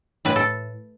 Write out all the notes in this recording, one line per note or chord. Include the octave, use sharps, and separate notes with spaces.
A2 B4
A4